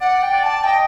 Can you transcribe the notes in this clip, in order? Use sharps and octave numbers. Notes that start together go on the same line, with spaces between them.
D5 F#5
G5
D5
A5
D#5 G5